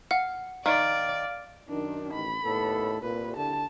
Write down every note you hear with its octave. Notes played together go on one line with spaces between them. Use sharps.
F5 F#5
D#3 D5 F5 F6 D7
F#2 D#3 D4
A1 B5
D#2 A2 B3 A4
C2 A#2 B4
D3 A5